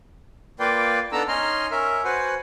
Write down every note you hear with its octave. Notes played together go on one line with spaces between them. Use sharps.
A#3 F4 B4 D5 F5 G5
B3 D4 D#4 A4 A#5 E6
C#4 D#4 D#5 G#5 C6 F6
C#4 A#4 E5
F#4 B4 C5 F#5 G#5